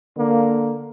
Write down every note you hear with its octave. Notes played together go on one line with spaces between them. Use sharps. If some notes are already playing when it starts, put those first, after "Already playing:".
D3 A#3